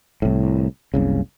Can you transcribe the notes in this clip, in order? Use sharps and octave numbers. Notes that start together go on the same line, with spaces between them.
C2 A2
F#1 C2 C#3